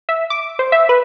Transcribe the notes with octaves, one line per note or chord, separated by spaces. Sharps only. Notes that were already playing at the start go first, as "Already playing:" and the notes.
E5
D6
C5
E5
B4